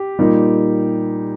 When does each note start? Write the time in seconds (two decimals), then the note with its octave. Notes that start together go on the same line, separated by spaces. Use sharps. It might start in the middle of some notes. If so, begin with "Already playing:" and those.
Already playing: G4
0.18 A#2 G3 A#3 D#4